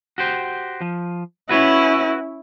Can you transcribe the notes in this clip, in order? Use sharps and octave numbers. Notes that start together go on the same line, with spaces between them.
F#4 G4 C5
F3
C#4 E4 F#4 B4 C#5